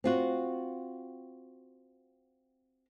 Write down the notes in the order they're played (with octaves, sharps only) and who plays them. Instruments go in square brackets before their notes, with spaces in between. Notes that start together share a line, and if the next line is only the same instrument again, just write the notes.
[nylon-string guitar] C4 F4 F#4